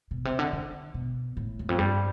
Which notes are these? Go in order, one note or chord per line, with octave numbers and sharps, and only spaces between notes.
B2
C3
D3
D3
B2
A2
E2
F2
G2